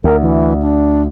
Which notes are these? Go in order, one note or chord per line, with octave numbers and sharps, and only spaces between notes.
D2 A#4
E3
D4